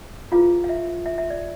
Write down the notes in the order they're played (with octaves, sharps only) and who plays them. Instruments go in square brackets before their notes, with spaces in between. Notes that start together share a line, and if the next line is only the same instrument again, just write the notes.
[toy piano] E4 F4 G#4 B4 F5
F5
E5
E5
E5
D5